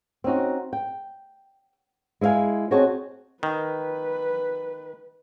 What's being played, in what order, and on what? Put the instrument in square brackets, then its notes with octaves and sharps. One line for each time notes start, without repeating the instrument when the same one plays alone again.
[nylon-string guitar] C4 C#4 D#4 F#4
G5
G#3 E4 D#5 F5 G#5
C4 F#4 G#4 C#5 D#5 A5
[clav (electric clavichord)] D#3 [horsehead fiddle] B4